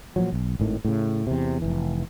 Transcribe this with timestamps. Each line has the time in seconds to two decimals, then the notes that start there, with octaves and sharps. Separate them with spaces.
0.16 A#2 F3 F#3
0.33 B1
0.60 G#1 A2 D#3
0.85 A2 C#3
1.27 E2 C3
1.62 F1 C#2 E3